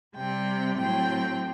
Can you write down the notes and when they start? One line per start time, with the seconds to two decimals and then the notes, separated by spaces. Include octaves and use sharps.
0.15 C3 G3 C4 G5
0.78 A2 F#3 C4 G5